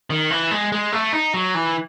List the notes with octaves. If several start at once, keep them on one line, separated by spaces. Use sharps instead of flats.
D#3
E3
G#3
G#3
A3
D#4
F#3
E3